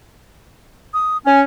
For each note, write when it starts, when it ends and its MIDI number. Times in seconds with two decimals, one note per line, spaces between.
0.94 1.18 87
1.26 1.43 61
1.26 1.39 80